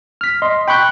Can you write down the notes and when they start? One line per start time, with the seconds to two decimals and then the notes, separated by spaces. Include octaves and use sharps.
0.21 F6 B6
0.42 D#5 C6
0.68 G5 B5 C#6 F#6 G6